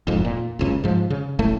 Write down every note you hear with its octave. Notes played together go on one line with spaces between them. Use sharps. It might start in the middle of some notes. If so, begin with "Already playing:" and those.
E1 F2 G#2
A#2
F#1 C#2 C#3
G#2 F3
C#3
E1 A1 A2 A3